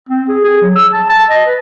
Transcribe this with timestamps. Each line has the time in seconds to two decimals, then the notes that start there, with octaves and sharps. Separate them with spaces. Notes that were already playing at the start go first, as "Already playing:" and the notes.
0.09 C4
0.28 G#4
0.44 G#4
0.62 F#3
0.76 E6
0.93 A5
1.09 A5
1.30 D#5
1.47 B4